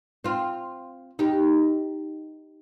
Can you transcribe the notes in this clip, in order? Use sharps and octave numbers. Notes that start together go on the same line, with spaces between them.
C4 F4
D#4 G4